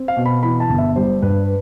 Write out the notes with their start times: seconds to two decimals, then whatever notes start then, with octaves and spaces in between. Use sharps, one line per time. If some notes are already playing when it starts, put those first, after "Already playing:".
Already playing: C4
0.08 F5
0.17 B2
0.26 B5
0.43 E3 B5
0.60 A5
0.69 G1
0.78 E5
0.96 G3 C5
1.22 G2 B4